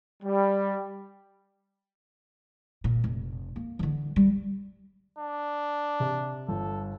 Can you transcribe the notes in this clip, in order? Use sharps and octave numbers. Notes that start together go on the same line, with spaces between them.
G3
A#2
F1
A#3
D3 E3
G3
D4
C3
G1 A4